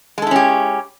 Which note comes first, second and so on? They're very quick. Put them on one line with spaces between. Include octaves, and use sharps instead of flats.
G#3 A4 E4 C#4 G4